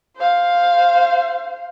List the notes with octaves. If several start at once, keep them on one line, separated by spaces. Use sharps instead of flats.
C5 F5